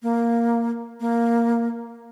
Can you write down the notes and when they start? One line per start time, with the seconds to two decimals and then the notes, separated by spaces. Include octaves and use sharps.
0.03 A#3
1.00 A#3